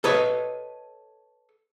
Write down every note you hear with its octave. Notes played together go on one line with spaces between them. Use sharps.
A4 B4 C#5 D#5